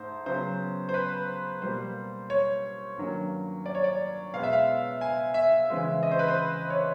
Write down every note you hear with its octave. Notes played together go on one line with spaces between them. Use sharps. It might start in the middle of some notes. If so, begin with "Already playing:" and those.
Already playing: G#2 A3 C5
C#3 F#3 B3 C5
C5
B4
B2 G3 A#3 C5
C#5
G2 D#3 F#3 A#3 C#4
D5
C#5
D5
B2 G#3 B3 F5
E5
F5
G#5
E5
C#3 E3 G#3 C4
D#5
C5
B4
C5
C#5